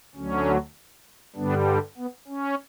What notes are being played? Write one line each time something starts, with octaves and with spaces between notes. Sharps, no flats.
D2 D3 F#3 C#4
G2 D3 G3 B3 D4
B3
C#4